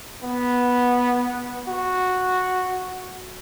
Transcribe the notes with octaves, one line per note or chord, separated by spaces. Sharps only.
B3
F#4